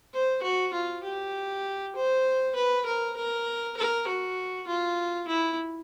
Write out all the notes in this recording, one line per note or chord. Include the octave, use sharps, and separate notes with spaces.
C5
F#4
F4
G4
C5
B4
A#4
A#4
A#4
F#4
F4
E4